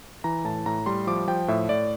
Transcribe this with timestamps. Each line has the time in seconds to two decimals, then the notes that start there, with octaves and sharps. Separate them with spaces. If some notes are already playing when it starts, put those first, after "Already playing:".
0.24 E3 A#5
0.45 A2 A5
0.66 A2 A#5
0.86 G3 C6
1.07 F3 D6
1.28 F3 G5
1.48 A2 E5
1.69 A2 D5